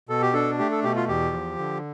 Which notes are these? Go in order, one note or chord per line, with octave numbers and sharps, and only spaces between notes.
B2 A4
G4
D4 A4
A3 G4
A4
B2 G4
F4
E2 G4
F3
D3